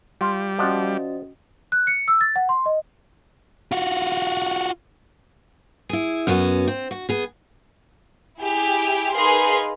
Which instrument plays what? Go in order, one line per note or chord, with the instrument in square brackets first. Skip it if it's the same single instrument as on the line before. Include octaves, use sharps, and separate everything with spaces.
[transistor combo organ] G3 [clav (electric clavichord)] F4
[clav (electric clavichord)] F3 D5 F#5 [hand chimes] C#4 F#4 D#5
[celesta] F#6
C#7
E6
A6
F#5
C6
D#5
[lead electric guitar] F4 F#4
[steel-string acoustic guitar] E4 G#4
F#2 B3 C#4 F4 F#4
C4
F#4
B3 G#4
[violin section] E4 G4 G#4
D#4 G#4 A#4 B4 F5 C6